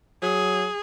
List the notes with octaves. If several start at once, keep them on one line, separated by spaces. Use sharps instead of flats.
F#3 G#4